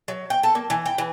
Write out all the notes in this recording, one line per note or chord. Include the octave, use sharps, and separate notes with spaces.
F#3
G5
A4
A#3
E3
G5
E3